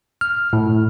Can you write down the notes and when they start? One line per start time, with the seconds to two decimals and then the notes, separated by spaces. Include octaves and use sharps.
0.21 F6
0.53 A2